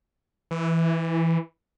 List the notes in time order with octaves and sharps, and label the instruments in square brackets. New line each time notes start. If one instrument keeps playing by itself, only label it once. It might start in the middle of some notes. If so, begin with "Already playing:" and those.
[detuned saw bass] E3